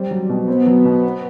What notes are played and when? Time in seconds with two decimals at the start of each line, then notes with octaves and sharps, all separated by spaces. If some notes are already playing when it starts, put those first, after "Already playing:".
Already playing: G3 C4
0.11 F#3
0.29 B2
0.48 B3 C4
0.67 F#3
0.85 B2
1.03 C4